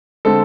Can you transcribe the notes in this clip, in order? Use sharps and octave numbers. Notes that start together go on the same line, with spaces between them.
D3 G#3 C4 A4